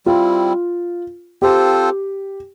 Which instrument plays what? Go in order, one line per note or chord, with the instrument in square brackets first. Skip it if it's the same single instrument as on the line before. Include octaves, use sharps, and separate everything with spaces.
[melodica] G3 C4 E4 [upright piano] F4
[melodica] C4 F4 A4 C5 [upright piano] G4